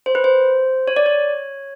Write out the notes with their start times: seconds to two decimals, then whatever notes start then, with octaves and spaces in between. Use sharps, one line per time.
0.06 C5
0.15 B4
0.24 C5
0.88 C#5
0.96 D5
1.06 C#5